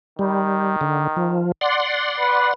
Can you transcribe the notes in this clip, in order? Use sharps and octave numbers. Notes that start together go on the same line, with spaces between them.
D#3 G3
D3
F3
D5 F#5 C6
B4